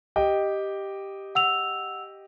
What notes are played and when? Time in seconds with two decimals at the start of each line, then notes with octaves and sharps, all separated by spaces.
0.16 G4 D#5 G5
1.35 F#5 E6 F7